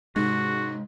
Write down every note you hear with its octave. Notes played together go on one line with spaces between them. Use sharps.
G#2 C3 G#3 F#4